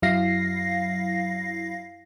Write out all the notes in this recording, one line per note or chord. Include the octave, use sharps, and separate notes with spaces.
F#2 F#3 E4 F5 A#6 C7